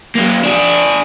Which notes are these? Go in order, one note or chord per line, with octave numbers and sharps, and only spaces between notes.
F#3 A#3
D4 G#4